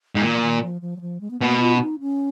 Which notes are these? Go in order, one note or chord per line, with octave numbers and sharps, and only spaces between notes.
G#2
A#2 D#3
F3
D#3
F3
F3
F#3
F3
G#3
B3
B2 A#3
F4
C#4
D#4
C#4